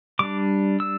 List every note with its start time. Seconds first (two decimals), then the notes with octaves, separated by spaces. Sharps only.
0.19 G3 D4 D6
0.80 E6